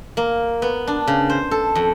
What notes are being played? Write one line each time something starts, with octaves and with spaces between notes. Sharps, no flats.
A#3
B3
D4
C#3
C5
A4
F2